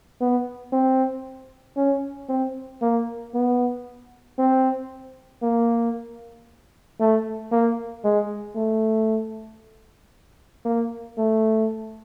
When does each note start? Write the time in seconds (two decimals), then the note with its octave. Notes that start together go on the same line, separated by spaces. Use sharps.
0.21 B3
0.72 C4
1.77 C#4
2.29 C4
2.82 A#3
3.34 B3
4.38 C4
5.42 A#3
7.00 A3
7.52 A#3
8.04 G#3
8.56 A3
10.65 A#3
11.18 A3